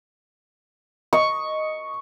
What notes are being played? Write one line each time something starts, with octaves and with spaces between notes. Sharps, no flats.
D#5 C#6